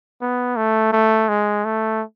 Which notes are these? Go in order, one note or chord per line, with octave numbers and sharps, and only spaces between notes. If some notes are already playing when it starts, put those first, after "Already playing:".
B3
A3
A3
G#3
A3